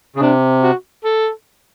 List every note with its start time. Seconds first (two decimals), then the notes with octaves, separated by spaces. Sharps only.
0.16 C#3
0.20 C3 D4
0.62 F#4
1.04 A4